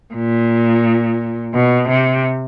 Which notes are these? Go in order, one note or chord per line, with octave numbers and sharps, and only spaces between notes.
A#2
B2
C3